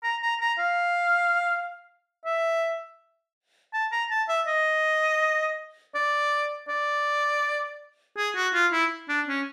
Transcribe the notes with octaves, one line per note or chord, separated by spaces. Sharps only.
A#5
A#5
A#5
F5
E5
A5
A#5
A5
E5
D#5
D5
D5
G#4
F#4
F4
E4
D4
C#4